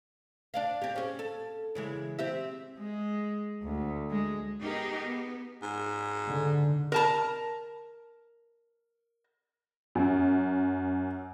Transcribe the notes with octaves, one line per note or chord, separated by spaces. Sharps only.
D4 D5 F5
C4 G4
C#4 G#4
A4
C#3 E3 G#3
C4 G4 E5
G#3
D2
G#3
B3 D#4 G4 G#4 A#4
B3
G#2
D3
A#4 A5 A#5
F#2